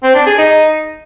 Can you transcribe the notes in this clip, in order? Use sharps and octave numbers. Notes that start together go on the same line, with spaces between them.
C4
D4
G#4
D#4